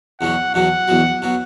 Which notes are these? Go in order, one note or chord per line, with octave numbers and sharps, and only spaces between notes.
E2 B2 F#3 F#5
E2 B2 F#3 F#5
E2 B2 F#3
B2 F#3